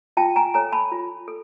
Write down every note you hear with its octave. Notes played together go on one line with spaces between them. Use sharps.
F4 G5 A5
G#5 A#5
A4 C#5 G#5 A#5
A5 B5
F4
A4